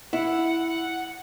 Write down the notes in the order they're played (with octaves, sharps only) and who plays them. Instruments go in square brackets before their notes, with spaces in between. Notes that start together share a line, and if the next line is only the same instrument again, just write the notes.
[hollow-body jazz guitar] E4 [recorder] F#5